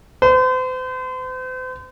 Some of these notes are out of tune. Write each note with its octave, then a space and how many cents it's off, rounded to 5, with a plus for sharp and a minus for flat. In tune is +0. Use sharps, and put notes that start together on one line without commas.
C5 -40